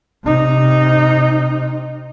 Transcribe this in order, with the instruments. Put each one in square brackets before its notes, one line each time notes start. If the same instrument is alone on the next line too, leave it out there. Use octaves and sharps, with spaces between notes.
[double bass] C3 D#4